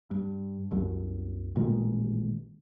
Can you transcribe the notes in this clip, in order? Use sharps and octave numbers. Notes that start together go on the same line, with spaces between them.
G2
C2 F#2 F#3
A1 A#2 D#3 G#3